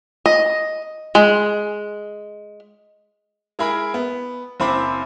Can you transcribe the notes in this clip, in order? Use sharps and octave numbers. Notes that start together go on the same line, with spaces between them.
D#5
G#3
G#3 E4 G#4 A#4 B5
B3
F#1 C4 E4 C5 B5 D6